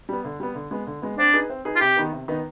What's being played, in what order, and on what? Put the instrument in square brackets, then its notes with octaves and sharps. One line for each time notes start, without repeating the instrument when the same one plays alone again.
[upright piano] G3 B3
D3
G3 B3
D3
G#3 B3
D3
G#3 B3
[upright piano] C4 [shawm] D4
[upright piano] D#4 G#4 B4
C4
D#4 G#4 B4
[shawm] F4
[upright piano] C3 [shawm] G4
[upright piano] D#3 B3 D#4 B4
C3
D#3 B3 D#4 B4